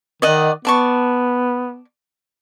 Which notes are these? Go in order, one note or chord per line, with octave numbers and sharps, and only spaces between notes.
D#3 D5 D#5 F#5
B3 D5 A5 C#6